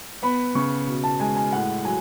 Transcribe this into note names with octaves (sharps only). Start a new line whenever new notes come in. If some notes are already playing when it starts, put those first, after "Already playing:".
B3 B5
C#3 C#6
B2
A5
G#3 G#5
G#5
A2 F#5
F#3 G#5